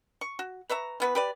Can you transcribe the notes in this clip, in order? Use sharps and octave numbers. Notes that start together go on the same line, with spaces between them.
C#6
F#4
B4 C#5 E5 A#5
E3 B3 B4
G4 B4 D5